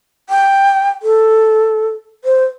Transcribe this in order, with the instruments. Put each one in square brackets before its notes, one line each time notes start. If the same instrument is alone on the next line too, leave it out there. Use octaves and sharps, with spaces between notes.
[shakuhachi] G5
A4
C5